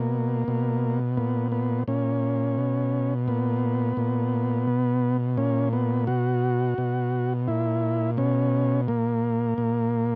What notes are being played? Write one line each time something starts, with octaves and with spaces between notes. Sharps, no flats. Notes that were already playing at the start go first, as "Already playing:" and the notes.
Already playing: B2 A#3
B2
A#2 B3
B3
A#2 C#4
B2
A#2 B3
A#2
B2
A#2 C#4
B3
B2 F#4
B2
A#2 E4
B2 C#4
A#2 A#3
A#2